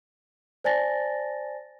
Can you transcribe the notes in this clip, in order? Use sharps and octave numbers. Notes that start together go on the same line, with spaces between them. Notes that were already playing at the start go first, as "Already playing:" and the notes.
C5 D5 G#5 A5 A6 A#6